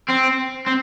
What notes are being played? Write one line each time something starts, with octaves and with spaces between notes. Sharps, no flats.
C4
C4